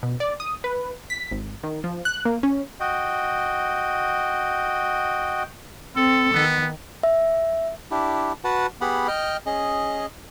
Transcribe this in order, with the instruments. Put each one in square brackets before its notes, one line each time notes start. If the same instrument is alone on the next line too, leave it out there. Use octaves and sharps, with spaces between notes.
[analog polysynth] B2
D5
D#6
B4
B6
G#1
D#3
F3
F#6
A#3
C#4
[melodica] F#4 D#5 G5
[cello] C4 [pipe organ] A4
[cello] D#3 [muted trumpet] B3
[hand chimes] E5
[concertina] D4 E4 G4
F#4 B4 F#5 A5
B3 G4 G#4 F#5 B5
D#5 G5 F6
C#4 G#4 D#5